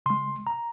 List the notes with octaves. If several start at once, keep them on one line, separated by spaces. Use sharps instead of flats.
C#3 G#3 C6
A#5